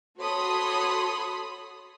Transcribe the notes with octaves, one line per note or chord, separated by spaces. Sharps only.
F#4 A4 C#5 B5 C6 D#6